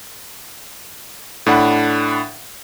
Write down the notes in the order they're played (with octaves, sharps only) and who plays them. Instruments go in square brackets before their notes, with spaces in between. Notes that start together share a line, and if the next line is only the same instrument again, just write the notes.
[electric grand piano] A2 D4 F#5 B5